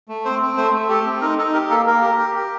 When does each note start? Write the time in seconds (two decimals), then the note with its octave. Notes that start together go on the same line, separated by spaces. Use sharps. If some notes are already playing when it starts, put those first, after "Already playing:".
0.08 A3
0.25 C4 C5
0.42 C4
0.57 A3 C5
0.74 A3
0.89 G4 A4
1.06 C4
1.21 D#4 A#4
1.38 D#4 A4
1.53 G4 A#4
1.70 A#3 A4
1.86 A#3 A#4
2.02 G4
2.18 G4
2.35 G4